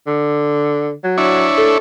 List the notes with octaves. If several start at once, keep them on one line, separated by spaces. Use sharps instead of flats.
D3
F#3
D4 E4 C#5
A4